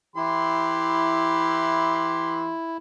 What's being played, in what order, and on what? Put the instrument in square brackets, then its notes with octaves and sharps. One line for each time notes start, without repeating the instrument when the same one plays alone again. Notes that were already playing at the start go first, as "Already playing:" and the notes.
[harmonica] E3 G4 C6 [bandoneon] E4